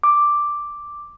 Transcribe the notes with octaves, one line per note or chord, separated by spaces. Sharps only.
D6